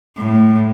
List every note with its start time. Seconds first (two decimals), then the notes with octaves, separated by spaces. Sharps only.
0.17 A2